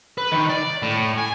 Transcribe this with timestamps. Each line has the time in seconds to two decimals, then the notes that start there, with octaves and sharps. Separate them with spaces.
0.18 B4
0.32 D#3
0.49 D5
0.82 A2
1.18 G#5